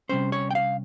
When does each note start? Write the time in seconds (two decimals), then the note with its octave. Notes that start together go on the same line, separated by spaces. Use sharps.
0.09 C3 G3 C#4 C5
0.32 C#5
0.51 G5
0.55 F5